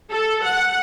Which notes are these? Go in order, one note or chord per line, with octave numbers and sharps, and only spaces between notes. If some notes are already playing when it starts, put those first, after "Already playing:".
A4
F#5